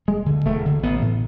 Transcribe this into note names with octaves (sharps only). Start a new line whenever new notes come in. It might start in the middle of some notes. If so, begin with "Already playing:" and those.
E1 G#3
D2 D3
E1 A3
D2 D3
A1 B3
A2